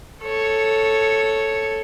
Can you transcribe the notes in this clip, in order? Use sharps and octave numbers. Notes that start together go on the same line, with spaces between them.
A4 C#5